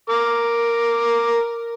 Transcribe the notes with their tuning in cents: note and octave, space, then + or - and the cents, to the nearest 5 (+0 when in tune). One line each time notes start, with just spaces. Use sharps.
A#4 +0 D6 +0